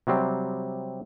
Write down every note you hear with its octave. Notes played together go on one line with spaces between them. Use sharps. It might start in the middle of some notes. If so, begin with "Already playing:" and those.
C3 F#3 G3 C4